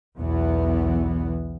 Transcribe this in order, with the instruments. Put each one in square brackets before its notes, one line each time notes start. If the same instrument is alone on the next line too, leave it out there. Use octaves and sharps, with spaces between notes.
[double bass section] B1 E2 E3 B3